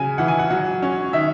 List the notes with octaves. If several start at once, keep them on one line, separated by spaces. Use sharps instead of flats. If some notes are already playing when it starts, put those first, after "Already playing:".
Already playing: C#3 F#3 G#5
E3 F#5
G#5
F#5
F#3 F#5
C#4
D#3 E5